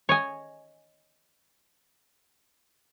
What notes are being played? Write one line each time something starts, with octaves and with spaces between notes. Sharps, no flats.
C#5 D#5 G#5